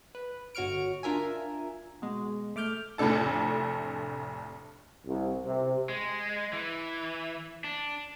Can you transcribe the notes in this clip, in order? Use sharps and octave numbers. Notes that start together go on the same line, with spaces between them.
B4
G1 F#4 C#5 C#6 F6 D7
D4 F4 A#4 E5 G#5
B2 G#3
A3 D6 F6 G6
F1 F2 A2 D4 A4 A5
C2
C3
G#3
E3
D4